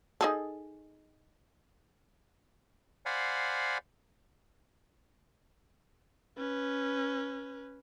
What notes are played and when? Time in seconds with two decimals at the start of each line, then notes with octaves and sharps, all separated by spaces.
0.21 D#4 G#4 A4
3.06 C5 D5 F5 F#5 G#5 B5
6.37 C#4 B4